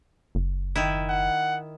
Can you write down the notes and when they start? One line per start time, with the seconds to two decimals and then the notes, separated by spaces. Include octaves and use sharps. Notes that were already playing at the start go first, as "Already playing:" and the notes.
0.35 F#1
0.76 D#3 E4
1.09 F#5